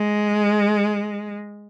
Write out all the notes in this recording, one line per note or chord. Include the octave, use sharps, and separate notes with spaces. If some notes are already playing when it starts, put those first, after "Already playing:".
Already playing: G#3